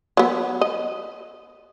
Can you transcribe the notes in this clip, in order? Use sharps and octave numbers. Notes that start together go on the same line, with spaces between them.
F#3 B3
D#5